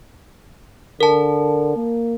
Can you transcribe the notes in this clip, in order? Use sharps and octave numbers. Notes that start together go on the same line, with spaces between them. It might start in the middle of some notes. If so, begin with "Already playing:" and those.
D3 A#4 A5
A#3